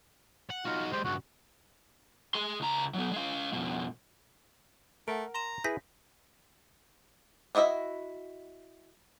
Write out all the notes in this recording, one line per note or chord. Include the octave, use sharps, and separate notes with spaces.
F#5
D#4 F4 F#4
G#3 G4 C5
C#2 G2 F#4
G#4 C6
C#2 A#5
F#3 B3
G#3 F5
F2 B2
A3 A#4 F#5 D7
A#5 C6 E7
E4 G#4 B4 G6 A#6 B6
D4 E4 F#4 D#5 E5